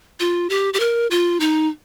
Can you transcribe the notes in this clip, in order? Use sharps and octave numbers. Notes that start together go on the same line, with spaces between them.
F4
G4
G4
A#4
F4
D#4